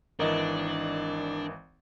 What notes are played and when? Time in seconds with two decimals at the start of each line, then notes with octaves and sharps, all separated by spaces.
0.19 G#1 E3 D4 A#4 D#5